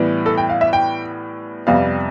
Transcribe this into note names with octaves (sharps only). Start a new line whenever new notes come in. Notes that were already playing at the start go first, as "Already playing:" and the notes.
Already playing: A2 E3 G3 B3
A4
G5
F5
E5
G5
F2 C3 G3 B3 F5